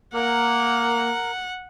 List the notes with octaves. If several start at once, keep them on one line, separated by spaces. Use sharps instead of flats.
A#3 A#4 F#5